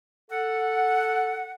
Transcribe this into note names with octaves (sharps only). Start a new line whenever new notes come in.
A4 F#5